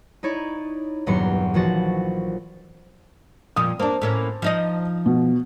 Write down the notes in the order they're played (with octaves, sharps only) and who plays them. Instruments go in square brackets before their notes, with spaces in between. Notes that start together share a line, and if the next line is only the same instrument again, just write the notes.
[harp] D#4 E4 C#5 D5
D#1 E2 G2 F#3 C6 C#7
A#1 E3 F3 F#4 A6
[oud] F2 A#2 F3 [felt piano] D#6
[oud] A#3 D4 [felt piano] C5 A5
[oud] A2 A#3 C#4
F3 D#4 D#5
[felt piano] B2